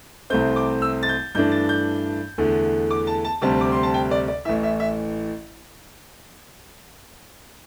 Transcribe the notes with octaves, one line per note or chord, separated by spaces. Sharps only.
C2 C3 A3 C4 G6
D6
E6
A6
G6
G2 E3 A3 D4 G6
A6
G6
E2 D3 A3
D6
A5
A5
D2 C3 G3 C4 A5
D6
C6
A5
G5
D5
D5
A1 A2 E3 E5
E5
E5